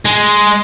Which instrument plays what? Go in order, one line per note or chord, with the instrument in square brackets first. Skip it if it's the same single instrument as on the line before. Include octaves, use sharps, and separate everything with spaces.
[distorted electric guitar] G#3